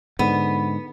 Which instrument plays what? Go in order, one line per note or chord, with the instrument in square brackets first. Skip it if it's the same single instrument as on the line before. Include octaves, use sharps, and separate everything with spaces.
[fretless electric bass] G#2 D3 [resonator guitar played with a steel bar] B3